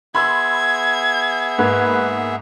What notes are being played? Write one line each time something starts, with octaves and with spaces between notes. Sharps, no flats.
B3 G#4 E5 B5 C6 E6 G#6
G#2 A#3 B4